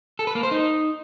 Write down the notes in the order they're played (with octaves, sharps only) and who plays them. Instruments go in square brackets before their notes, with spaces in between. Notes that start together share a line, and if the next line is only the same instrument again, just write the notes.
[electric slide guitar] A4
B4
A#3
C5
D#4